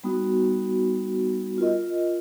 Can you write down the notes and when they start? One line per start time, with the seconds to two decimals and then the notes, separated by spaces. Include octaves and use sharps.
0.04 G3 B3 D#4 F#4
1.58 F4 A#4 D#5